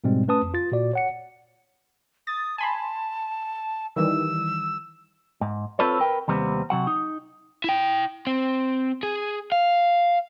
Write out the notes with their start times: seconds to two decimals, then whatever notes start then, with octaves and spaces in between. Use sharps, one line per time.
0.04 G#2 B2 G3 G#3 C4
0.28 A3 C#4 B4 A5 D#6
0.42 F2
0.54 F4 A6
0.72 A#2 F#4 D5
0.93 C#5 F#5 C#7
2.27 D#6 A6
2.58 G#5 A5 B5 C6
3.96 D#3 E3 G3 E6
5.41 G#2
5.79 C4 F4 A4 B4 C#5
6.00 A#4 B4 G5
6.28 D#2 C3 G3 B3 C4
6.70 C3 F#3 F#5
6.87 D#4
7.64 E4 G5
8.27 C4
9.03 G#4
9.52 F5